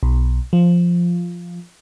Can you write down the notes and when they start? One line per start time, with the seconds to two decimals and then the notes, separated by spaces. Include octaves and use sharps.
0.03 B1
0.53 F3